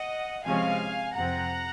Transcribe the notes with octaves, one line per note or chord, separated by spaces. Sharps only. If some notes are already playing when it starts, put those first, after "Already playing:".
Already playing: D#5 F#5
C3 F3 G#3 C#4 F5 G#5
F2 C3 F3 C4 F#5 A#5